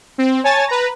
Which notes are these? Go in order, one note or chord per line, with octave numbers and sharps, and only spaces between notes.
C4
C#5 G#5 A5 A6
B4 A#5